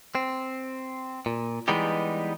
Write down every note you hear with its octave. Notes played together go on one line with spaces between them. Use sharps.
C4
A#2
E3 G3 G#3 B3 D#4 G4